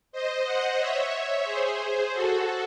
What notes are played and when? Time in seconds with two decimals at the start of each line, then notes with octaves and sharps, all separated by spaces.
0.12 C5 D#5
0.45 D#5 F#5
0.78 C#5 E5
1.45 G#4 C5
2.12 F#4 A4